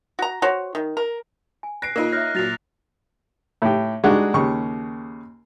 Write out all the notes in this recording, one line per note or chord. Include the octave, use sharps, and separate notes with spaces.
F#4 A#5
F#4 C5 C#5
D#3
A#4
G#5
F#6 A#6 C7 D7
A#3 D#4 F4 A#4
C#5 E5 F6 F#6 A#6
A#2 F#3 F#6 A6 F7
A2 G4
G3 G#3 D4 D#4 F#4 F#5
D#2 C#3 G4 C#6